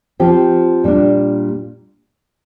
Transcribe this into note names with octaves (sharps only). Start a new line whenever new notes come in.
F3 C4 G4
A#2 G3 D4